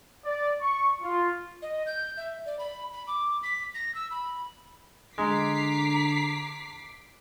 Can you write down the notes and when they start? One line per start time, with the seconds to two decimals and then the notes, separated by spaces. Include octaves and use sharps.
0.25 D5
0.61 C#6
1.02 F4
1.62 D#5
1.86 G6
2.17 E5
2.46 D5
2.59 B5
2.92 B5
3.07 D6
3.43 B6
3.75 A#6
3.95 E6
4.11 B5
5.18 D3 G#3 A#5 D6 B6 C7